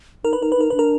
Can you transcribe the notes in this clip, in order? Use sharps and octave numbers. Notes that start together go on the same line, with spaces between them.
D#4 A#4
B4
D#4 A#4
B4
D#4 A#4
D4 B4
A#4